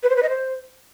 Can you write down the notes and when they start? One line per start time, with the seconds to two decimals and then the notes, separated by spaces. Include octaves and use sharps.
0.03 B4
0.10 C5
0.16 B4
0.23 D#5
0.29 C5